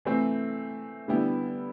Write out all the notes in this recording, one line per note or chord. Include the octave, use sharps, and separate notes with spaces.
E3 A3 C4
D3 G3 B3 E4 G4